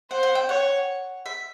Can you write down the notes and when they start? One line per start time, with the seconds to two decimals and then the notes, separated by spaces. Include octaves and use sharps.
0.11 C5 F#5
0.23 F#5
0.35 G5
0.48 C#5 F#5
1.26 E5